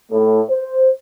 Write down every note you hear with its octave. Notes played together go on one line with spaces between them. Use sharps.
A2
C5